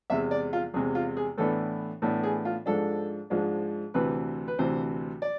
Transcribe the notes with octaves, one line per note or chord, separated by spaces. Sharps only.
E2 C3 G#3 E5
D5
F4
E2 C3 G#3 G#4
F4
G#4
A2 E3 B3 D4 A4
A2 E3 B3 D4
G#4
F4
G#2 F3 G#3 D4 A4
G#2 F3 G#3 D4
D2 C3 E3 B4
B4
D2 C3 E3 C5
D5